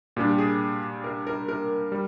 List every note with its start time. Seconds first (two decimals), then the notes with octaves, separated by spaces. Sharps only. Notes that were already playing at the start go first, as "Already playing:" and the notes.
0.17 A#2 G3 D4 G4
0.29 G4
0.38 G#4
1.04 A#4
1.27 A#4
1.48 A#4
1.92 G3